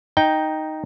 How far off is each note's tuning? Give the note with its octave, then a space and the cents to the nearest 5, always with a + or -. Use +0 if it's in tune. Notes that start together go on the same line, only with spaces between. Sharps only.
D#4 +0 G5 +0